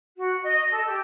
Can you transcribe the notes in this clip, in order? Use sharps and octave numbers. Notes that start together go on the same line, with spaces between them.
F#4
D#5
A4
G4